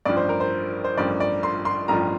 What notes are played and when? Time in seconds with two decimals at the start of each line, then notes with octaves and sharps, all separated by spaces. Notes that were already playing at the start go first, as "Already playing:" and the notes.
0.05 A1 G2 F3 D5
0.17 C5
0.29 A#4
0.40 C5
0.84 C5
0.97 A1 G2 F3 D5
1.20 D5
1.43 C6
1.65 C6
1.88 A1 G2 F3 A#5